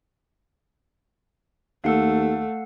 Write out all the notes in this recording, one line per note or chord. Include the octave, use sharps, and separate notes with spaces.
D#2 A3 F5 F#5 E6